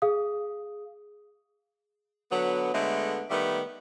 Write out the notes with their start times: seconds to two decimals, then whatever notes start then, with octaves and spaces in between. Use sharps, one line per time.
0.02 G#4 F5 D#6
2.31 D3 F#3 B3
2.74 D3 G#3 A3 B3
3.29 D#3 G3 A3 B3